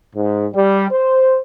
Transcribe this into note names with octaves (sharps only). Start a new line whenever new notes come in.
G#2
G3
C5